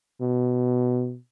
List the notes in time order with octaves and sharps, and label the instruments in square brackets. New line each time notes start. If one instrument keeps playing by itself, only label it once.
[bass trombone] B2